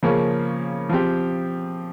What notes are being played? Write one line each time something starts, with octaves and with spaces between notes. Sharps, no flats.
C#3 F3 A#3 C#4
F3 C4 G4